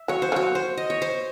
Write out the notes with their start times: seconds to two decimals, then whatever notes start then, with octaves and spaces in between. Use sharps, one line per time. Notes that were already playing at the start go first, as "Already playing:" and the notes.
Already playing: E5
0.08 F#3 C#5
0.22 C5
0.32 F#3 C#5
0.55 C5
0.77 D#5
0.90 C#5
1.02 C5